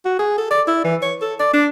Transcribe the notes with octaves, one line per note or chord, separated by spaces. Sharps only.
F#4
G#4
A4
D5
E4
E3
C#5
A4
D5
D4